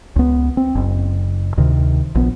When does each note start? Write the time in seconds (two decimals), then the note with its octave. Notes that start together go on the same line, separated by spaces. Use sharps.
0.16 C#2 B3
0.57 C4
0.75 F#1
1.57 D2 C3 D#3
2.15 A#1 B3